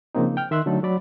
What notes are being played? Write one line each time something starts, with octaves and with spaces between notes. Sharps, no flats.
C#3 F3 A#3 C4 D#4
G5 F6
D#3 E5 C6 E6 F#6
D3 F#3 A3 D#4 A4
F#3 D5 B5